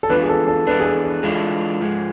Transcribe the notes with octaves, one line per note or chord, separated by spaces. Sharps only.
A4
E3 B3 D4 F4 B4
G#4
A4
A4
E3 B3 D4 B4
G#4
A4
A4
E3 G#3 D4 F4 A4
G#2 F3 G#3